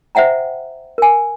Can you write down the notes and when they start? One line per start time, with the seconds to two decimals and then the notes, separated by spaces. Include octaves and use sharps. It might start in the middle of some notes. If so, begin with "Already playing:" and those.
0.15 C5 E5 F#5 G5 A#5
0.98 A#4 G#5